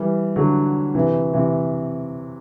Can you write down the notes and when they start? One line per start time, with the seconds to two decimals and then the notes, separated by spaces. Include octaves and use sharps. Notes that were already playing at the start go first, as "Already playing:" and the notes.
Already playing: E3 G3
0.36 D3 F#3
0.95 C3 E3
1.34 C3 E3